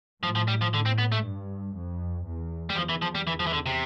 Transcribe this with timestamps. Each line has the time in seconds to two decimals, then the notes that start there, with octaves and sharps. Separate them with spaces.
0.23 A2 F3
0.36 F3
0.48 G3
0.61 F3
0.73 A2 D3
0.86 C4
0.98 B3
1.12 A3
1.24 G2
1.75 F2
2.26 E2
2.70 G3
2.76 E2 F3
2.89 E3
3.02 F3
3.15 G3
3.27 E3
3.40 F3
3.47 E3
3.53 D3
3.66 C3